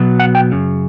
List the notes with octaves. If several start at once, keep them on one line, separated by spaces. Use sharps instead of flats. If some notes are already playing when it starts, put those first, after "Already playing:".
Already playing: B2 F#3 B3
F#5
G5
F#2 C#3